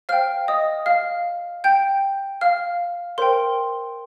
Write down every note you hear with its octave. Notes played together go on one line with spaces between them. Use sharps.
C5 F5 G5 F6
D#5 D#6
F5 F6
G5 G6
F5 F6
A#4 C5 G5 C6